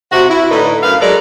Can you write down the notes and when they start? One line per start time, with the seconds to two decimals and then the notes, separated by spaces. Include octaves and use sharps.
0.12 C3 F#4
0.29 E4
0.50 A2 D3 D#4 B4
0.83 F#2 B4 F5
1.01 F#3 G#3 A4 A#4 D5